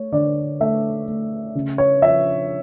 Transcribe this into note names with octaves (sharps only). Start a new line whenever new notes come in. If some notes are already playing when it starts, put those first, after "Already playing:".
Already playing: A3 C#5
D3 D5
A3 E5
A3
C#3
C#5
F3 E5